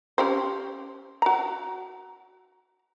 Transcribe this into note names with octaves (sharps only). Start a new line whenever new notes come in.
C#4 G4 C5
F#4 A#5